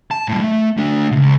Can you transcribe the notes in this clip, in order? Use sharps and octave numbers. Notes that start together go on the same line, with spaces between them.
A5
A2 G3
A3
A3 D4
C#2 C3